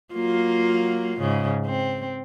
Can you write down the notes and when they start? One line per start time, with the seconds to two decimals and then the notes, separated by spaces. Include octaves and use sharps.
0.14 F#3 A#3 F4
1.20 G#2 C#3
1.66 C4